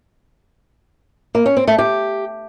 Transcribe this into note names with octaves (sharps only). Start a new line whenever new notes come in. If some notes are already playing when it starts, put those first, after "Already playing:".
A#3
C#4
C4
A3
G4